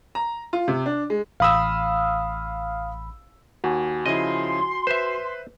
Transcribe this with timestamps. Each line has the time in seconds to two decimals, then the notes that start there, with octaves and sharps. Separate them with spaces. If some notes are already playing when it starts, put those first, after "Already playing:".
0.15 A#5
0.53 F4
0.68 C3
0.86 D4
1.10 G#3
1.40 A1 F5 B5 D#6 E6
3.64 D#2 F#4 G#5
4.06 C#3 F3 E4 D#5 C6
4.87 B4 C5 E5